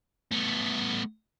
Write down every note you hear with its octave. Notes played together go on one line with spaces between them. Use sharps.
A3 B3